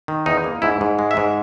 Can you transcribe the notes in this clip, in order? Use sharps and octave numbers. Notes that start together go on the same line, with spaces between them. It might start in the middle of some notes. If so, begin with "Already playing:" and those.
D#3
E2 D#4
A#3
G#2 E4
G#2
G#3
E5
G#2